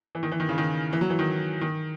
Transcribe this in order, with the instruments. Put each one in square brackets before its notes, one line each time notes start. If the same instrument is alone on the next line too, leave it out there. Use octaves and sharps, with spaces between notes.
[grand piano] E3
D#3
E3
D#3
C#3
D#3
E3
F#3
E3
D#3
D#3